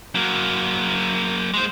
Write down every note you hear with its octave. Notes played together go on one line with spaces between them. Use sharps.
F#3 A#3
G#3 C5